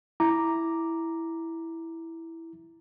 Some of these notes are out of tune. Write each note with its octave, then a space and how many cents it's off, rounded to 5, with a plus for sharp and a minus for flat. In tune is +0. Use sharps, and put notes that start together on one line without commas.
E4 +0 A#5 +0 D6 +0